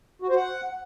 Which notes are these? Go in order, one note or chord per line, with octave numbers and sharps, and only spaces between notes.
F#4
C5
F#5